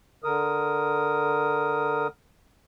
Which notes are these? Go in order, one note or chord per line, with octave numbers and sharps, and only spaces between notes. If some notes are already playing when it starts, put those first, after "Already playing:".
D3 A#4 D#6